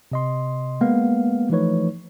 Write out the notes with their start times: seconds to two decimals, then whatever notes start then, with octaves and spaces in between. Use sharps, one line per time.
0.12 C3 D#5 C6
0.81 G#3 A#3 B3 B4 F5
1.49 E3 F3 A3 D#4 B4 C#5